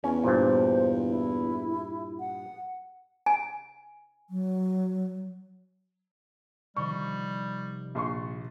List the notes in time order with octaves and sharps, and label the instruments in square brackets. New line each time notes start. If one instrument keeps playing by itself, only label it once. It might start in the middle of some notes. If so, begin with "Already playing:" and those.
[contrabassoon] E2 [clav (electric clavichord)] C#4
[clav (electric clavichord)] G2 A#2 [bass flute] C5
[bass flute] E4
F#5
[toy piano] G#5
[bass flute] F#3
[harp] C3 D#3 F3 [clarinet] G3 [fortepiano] C#6
[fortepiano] A#1 C6 C#6